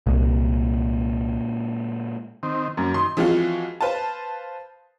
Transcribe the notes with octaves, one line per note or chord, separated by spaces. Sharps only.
C2 A#2 G#3 A#3
D#3 C4
F#2 A#3
D#3 C6
E3 F3 G#3 C4 F4 F#4
B4 C5 F5 A5